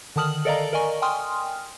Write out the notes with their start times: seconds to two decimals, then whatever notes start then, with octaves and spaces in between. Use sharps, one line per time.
0.16 D3 D#3 A5 D#6 F6 F#7
0.45 A4 A#4 D5 D#5 F5 A#5
0.73 A#4 D5 D#5 G#5 C#6
1.02 G5 G#5 C6 D#6 F6